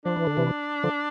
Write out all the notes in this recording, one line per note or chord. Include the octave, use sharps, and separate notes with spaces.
F3 D4
E3
D3
C3 E3
D3 F3